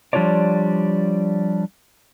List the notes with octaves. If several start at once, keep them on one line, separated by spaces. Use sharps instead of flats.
F3 G3 D4 F4 C#5 D5